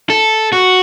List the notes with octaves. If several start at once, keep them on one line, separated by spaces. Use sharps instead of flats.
A4
F#4